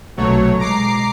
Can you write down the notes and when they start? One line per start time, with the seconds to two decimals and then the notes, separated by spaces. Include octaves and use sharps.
0.17 B1 C3 F#3 A3 C#5
0.59 B2 G#3 A#5 D6 C7